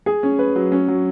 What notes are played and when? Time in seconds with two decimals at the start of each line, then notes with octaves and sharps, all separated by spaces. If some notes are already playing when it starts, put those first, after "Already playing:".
0.06 G#4
0.23 C#4
0.39 B4
0.55 F#3
0.72 C#4
0.88 F#3